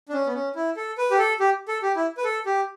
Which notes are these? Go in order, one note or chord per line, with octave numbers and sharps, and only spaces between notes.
D4
C#4
B3
C#4
E4
A4
B4
G4
A4
G4
A4
G4
E4
B4
A4
G4